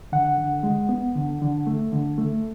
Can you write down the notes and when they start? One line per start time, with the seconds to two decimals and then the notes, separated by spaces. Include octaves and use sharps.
0.12 D3 F#5
0.38 D3
0.63 G#3
0.89 B3
1.15 D3
1.41 D3
1.67 A3
1.92 D3
2.18 A3